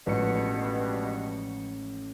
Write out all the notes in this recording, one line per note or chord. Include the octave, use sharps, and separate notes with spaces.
A1 G2 B2 F3 G#3 C#7